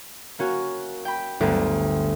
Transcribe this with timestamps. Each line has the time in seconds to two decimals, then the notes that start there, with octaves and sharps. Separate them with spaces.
0.39 A#3 C#4 F#4
1.05 G5 B5
1.40 G1 D2 B3 D6